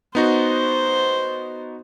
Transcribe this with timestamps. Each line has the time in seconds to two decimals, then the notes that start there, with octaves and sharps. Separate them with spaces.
0.15 B3 D#4 F#4 C5